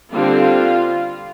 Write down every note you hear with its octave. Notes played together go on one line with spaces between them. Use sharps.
D3 G3 C4 F4